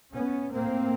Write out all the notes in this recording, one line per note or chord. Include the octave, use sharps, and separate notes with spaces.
B3 C#4
A2 A#3 C4